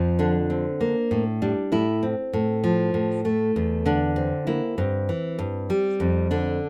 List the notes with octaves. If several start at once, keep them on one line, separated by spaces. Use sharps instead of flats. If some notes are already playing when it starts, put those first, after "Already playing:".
Already playing: F2 F3
D3 D4
C4
A#3
A2
G3 D4
A2 E4
C4
A2
F3
A2
A3
E2
D3 D4
C4
A#3 E4
G2 C4
E3
G2
G3
F2
D3 D4